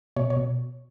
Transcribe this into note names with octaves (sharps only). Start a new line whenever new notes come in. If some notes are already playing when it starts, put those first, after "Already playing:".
B2 C#5
C#5
B2